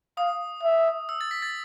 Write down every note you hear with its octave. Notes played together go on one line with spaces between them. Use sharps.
F5 D#6
E5
E6
A6
B6
A6